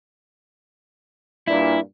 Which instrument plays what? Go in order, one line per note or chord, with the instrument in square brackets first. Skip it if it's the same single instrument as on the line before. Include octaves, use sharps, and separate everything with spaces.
[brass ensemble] G2 A#2 [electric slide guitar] E4